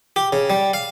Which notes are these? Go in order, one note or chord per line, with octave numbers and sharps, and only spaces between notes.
G4
C#3
G3
F5